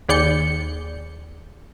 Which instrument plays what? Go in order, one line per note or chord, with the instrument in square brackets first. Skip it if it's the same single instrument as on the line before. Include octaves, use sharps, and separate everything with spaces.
[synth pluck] D#2 G#4 D5 G6 C#7